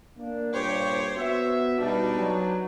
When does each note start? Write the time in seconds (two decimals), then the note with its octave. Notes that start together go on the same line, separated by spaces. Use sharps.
0.17 A#3 D4
0.52 G2 A#2 G4 C5 C#5
1.15 B3 F#4 E5
1.79 B2 G3 D4 D#4 B4
2.18 F#3